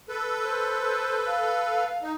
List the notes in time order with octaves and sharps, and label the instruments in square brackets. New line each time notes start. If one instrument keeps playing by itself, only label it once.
[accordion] A4 B4
[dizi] C5
F5
[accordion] D#4